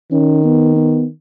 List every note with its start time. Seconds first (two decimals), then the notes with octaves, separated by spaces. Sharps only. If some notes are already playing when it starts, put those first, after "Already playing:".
0.12 D#3 C#4
0.45 B3
0.76 B3